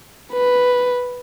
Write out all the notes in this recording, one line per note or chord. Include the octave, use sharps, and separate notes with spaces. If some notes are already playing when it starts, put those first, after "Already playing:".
B4